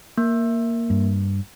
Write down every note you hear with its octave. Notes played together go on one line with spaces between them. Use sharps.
A#3
G2